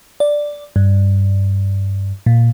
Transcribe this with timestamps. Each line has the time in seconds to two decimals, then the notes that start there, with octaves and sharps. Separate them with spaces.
0.20 D5
0.76 G2
2.26 A#2